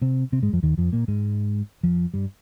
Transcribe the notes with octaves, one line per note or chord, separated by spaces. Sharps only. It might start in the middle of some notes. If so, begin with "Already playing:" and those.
C3 C4
C3 C4
G#2 G#3
F2 F3
D#2 D#3
F2 F3
A#2 A#3
G#2 G#3
F2 F3
G2 G3